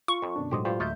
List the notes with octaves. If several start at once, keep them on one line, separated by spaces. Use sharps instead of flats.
F4 C#6
F2
F#2 B2 D3 D4
A2 F#3 G#3 G4 C5 D#5
G2 F4 G4 C5
D2 D#4 F4 C#5 E5 G6